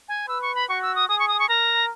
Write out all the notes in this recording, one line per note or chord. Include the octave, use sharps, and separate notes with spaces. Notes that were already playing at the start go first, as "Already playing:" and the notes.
G#5
B4 E6
C#6
B5
F#4 C#6
E6
D#6
G#4 D#6
C#6
D#6
C#6
A#4 A#5